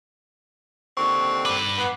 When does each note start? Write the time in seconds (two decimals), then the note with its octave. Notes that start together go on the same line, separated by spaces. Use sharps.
0.97 D#2 D3 C4 C#6
1.45 G2 B4 D6
1.78 B3